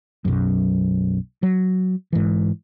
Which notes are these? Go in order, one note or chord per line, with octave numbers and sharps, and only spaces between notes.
B1 F#2
F#3
G#2 E3